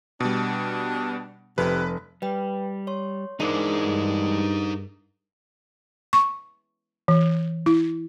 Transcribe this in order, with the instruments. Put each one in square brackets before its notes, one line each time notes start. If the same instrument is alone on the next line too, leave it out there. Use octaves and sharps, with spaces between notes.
[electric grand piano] B2 G3 [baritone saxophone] D4
[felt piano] F1 [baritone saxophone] C3 [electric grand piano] B4
[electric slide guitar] G3 [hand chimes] B4 G5
[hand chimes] C#5 C6
[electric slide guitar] E3 G#3 D4 [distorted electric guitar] D#4 C5 [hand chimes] G#4 A#4 D6
[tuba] G2
[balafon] C#6
E3
E4